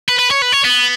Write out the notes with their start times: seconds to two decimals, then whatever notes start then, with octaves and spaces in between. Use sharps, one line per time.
0.09 B4
0.19 B4
0.31 C#5
0.42 B4
0.52 C#5
0.65 B3